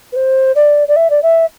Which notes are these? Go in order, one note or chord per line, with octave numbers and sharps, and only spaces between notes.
B4
C5
D5
D5
E5
D5
E5